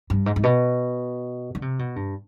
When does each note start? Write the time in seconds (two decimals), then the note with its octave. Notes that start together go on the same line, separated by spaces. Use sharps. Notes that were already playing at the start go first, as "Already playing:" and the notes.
0.10 G2
0.26 G#2
0.36 G#2
0.44 B2
1.55 D3
1.62 C3
1.79 B2
1.96 G2